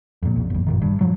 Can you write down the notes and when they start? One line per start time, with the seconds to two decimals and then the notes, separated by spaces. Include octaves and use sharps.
0.23 F2 A#2
0.36 B1 F2
0.50 G1 F2
0.67 F#2 A#2 D#3
0.82 G2
1.01 F3 F#3